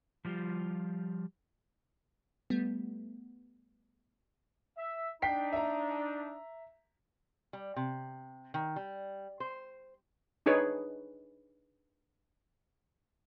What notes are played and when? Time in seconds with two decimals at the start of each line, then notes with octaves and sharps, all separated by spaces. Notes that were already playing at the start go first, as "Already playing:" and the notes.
0.25 F3 G3 F4 G4
2.50 G3 A3 B3
4.78 E5
5.22 D4 D#4 G5 B6 C7
5.53 E5 A#5
7.53 G3
7.76 C3
8.54 D#3
8.76 G3
9.40 C5
10.46 D4 D#4 G#4 B4 C#5